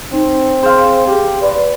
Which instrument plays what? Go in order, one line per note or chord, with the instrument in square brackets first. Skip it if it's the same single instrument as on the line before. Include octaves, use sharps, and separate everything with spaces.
[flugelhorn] C4 [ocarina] D#4
[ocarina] G#4 [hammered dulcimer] C5 F5
[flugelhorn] G4
[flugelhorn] B4 [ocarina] D5